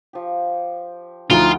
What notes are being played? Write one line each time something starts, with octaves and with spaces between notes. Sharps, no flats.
F3 G4
D2 F3 D#4 F4 G#4 F#5 G5 D7